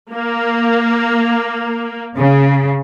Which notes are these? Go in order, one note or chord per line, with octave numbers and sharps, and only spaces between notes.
A#3
C#3